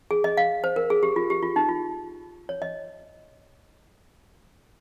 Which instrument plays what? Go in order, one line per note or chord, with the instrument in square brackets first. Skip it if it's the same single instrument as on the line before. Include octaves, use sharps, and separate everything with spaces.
[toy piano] G#4
D#5
F5
C5
A#4
G#4
G4
F4
G4
F4
D#4
F4
C#5
D#5